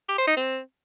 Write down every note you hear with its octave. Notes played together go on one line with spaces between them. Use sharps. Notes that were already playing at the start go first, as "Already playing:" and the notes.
G4
C5
D#4
C4